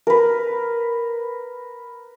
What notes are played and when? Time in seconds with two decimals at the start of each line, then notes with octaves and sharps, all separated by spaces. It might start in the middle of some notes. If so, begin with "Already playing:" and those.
0.07 A#4 B4